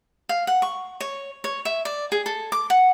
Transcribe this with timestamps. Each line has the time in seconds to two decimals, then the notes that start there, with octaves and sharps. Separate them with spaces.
0.29 F5
0.47 F#5
0.62 C#6
1.01 C#5
1.44 C#5
1.65 E5
1.85 D5
2.12 G#4
2.26 A4
2.52 D6
2.70 F#5